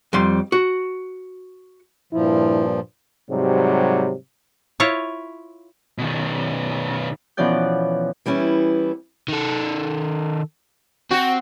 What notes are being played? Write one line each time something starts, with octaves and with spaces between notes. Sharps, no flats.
F2 G3 C6
F#4
G2 A#2 F3 E4
G#2 C3 F#3 G3
E4 F4 C#5
B2 D#3
B2 E3 F3 C#4 D5 G6
E3 G3 B3 C#4 E4
D#3 A4
C4 F#4